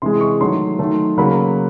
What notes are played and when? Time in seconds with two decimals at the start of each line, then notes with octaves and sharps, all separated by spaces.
0.02 C3 E3 G#3 C6
0.21 C#6
0.41 D#3 F#3 A3 C6
0.79 D#3 F#3 A3
1.17 C#3 F#3 A#3 B5